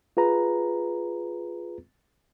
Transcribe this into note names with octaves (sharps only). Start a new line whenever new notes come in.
F4 G#4 B4 A#5